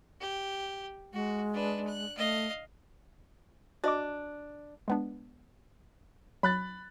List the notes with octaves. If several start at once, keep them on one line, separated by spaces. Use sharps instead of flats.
G4
G#3 F#4
D4 B4
F#6
A3 D#5 F5
D4 F#4 D#5 D6
G#3 B3 D4
F#3 B5 F#6 A6